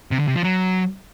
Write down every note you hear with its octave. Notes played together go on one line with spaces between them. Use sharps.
C3
D3
C3
F3
F#3